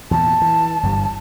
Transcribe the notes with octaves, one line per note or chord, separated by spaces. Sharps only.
E2 A#2 A5
E3
G1 G2 G3